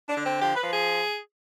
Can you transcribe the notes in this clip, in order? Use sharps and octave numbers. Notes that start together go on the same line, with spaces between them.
D4
D3
C4
F3 G4
B4
F3
G#4